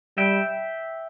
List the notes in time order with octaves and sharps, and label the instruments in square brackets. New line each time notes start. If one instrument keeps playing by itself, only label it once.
[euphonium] G3 [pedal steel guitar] E5 G5